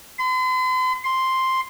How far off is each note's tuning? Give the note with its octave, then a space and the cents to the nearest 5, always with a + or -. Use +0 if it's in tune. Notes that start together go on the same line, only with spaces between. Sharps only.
C6 -45
C6 +0